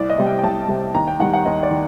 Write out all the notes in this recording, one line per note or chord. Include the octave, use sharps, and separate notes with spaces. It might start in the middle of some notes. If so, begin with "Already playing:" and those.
Already playing: C2 D5
D#5
C3 G3
G5
G5
C2 A5
C3 G3
D#2 A#5
G5
D#3 G3 F#5
F#5
D#2 D#5
D5
D#3